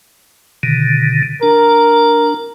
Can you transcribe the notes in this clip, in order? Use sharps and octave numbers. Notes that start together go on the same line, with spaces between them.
B2 D3 D#3
D4 A#4